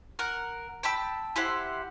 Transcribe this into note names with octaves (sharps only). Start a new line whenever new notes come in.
A#4 F#5
G5 A5 B5 E6
E4 G4 C5 F#5